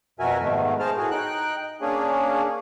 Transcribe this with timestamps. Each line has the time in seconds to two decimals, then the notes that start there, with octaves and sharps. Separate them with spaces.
0.20 F2 B2 F#4 A#4 E5 G#5
0.41 G#2 B2 D#3 A3
0.80 G#4 A#4 C5 A5 F6
0.97 A2 F#4 G#4
1.11 D#4 G5 F#6
1.81 A#3 C#4 D4 G#4